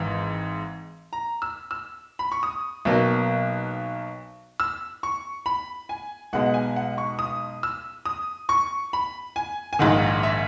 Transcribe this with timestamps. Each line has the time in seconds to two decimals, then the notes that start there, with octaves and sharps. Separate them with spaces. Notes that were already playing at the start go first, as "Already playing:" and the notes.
Already playing: G#1 G#2 E3
1.13 A#5
1.42 E6
1.71 E6
2.19 B5
2.32 C#6
2.43 D#6
2.85 B1 B2 F#3 A#3
4.60 E6
5.03 C#6
5.46 B5
5.89 G#5
6.33 B1 B2 G#3 F#5
6.46 F#5
6.54 G#5
6.76 F#5
6.98 C#6
7.19 D#6
7.63 E6
8.06 D#6
8.49 C#6
8.93 B5
9.36 G#5
9.73 G#5
9.79 A#1 G#2 D#3 F#5
10.23 E5